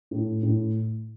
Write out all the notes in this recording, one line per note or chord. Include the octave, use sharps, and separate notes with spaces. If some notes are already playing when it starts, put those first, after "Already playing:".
A2
A2